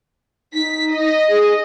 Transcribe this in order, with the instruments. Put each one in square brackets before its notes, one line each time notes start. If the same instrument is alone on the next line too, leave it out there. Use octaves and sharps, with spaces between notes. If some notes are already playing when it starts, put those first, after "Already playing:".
[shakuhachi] D#4 [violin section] B6
[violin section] D#5
[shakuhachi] G#4